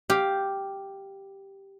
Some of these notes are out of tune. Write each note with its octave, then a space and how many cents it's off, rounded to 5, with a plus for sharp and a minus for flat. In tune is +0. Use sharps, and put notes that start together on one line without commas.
G4 +0 F5 +0